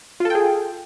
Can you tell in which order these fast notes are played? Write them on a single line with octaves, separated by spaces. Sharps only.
F4 A4 G5 G#4